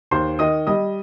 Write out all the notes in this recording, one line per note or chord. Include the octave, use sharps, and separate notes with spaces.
D#2 C5 C6
D#3 D#5 D#6
G3 D#5 D#6